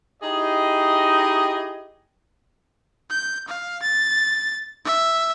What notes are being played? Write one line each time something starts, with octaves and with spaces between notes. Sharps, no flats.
D#4 E4 G4 G#4 D#5
G6
F5
A6
E5